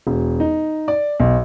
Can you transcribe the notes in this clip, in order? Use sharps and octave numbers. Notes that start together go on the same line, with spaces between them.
E1
D#4
D5
B1